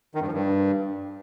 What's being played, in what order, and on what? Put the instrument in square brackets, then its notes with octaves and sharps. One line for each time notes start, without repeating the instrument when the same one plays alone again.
[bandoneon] D#3
G2
F3
G2